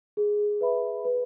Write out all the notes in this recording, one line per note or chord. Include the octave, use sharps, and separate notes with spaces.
G#4
B4 E5 B5
B4